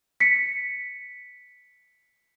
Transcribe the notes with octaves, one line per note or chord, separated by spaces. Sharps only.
B6 C#7